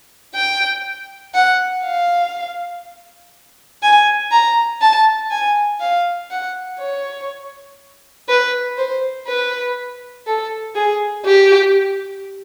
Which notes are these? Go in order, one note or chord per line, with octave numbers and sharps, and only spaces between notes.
G5
F#5
F5
G#5
A#5
A5
G#5
F5
F#5
C#5
B4
C5
B4
A4
G#4
G4